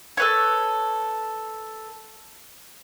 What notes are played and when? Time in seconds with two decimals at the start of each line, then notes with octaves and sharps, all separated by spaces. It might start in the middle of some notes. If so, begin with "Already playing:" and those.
0.17 A4 B4 C#5